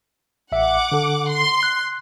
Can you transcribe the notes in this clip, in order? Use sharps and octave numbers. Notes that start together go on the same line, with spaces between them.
A1 E5 F#5 D6
D3 A4
C6
F#6